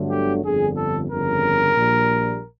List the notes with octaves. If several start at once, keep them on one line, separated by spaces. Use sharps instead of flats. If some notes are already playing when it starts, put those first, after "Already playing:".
Already playing: G1 G2 D3 F#3 A3
G4
G1 F2 D3 G#4
A4
G1 F2 C#3 A#4
A#1 A#2 G3